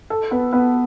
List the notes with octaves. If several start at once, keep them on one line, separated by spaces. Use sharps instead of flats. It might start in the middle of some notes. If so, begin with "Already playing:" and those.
A4
B3 B4
B3 B4